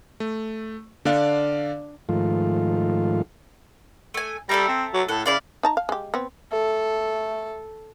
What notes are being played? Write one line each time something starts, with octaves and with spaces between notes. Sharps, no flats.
A3
D3 D4 D5 F5 C#6
G#2 D#3 F3 A3 F4
A3 G#5
G3 A4 E5 A#5
C4
F#3
A2 A4 F#5
C#3 E4 D5 F5
D#4 A5 A#5
F5
G#3 G4
B3 C4
A3 A4